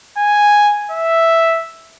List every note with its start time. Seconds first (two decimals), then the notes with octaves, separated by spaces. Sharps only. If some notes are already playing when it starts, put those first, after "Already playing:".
0.18 G#5
0.91 E5